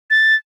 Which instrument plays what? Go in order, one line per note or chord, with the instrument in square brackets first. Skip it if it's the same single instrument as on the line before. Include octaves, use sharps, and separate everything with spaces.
[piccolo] A6